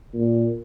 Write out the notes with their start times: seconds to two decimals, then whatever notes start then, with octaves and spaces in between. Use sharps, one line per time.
0.14 A#2